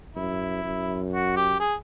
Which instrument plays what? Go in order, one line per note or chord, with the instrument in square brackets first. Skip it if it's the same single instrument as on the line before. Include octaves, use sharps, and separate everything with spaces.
[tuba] F#2 [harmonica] E4
[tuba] F#2
[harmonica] F#4
G4
G#4